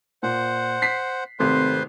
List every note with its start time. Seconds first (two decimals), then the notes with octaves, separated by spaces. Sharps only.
0.23 A#2 C5 F#5
0.82 B6 C7
1.39 G#1 C3 A3 B4 C5 C6